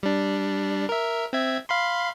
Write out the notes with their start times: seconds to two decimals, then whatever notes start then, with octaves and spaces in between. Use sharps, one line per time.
0.03 G3 D4
0.89 A#4 E5
1.33 C4 E5 G#6
1.69 F5 B5 C6